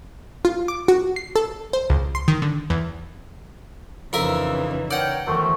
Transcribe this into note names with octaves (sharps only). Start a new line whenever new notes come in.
F4
D6
F#4
C7
A4
C5
C#2
C6
D#3
D3
E2
F2 C#3 E3 D#4 A#4 E5
A#4 C#5 D5 F#5 G5
E2 D#3 F3 F#3 A3 C5